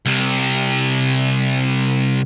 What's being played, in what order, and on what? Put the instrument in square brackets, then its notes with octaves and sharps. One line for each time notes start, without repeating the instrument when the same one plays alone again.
[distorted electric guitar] C2 C3